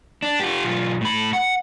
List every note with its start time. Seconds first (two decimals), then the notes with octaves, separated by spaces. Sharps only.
0.22 D4
0.40 F4 G4
0.64 B1 F4
1.01 A2 B5
1.33 F#5